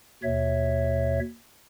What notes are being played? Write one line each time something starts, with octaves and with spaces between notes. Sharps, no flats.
D#2 B2 C#5 E5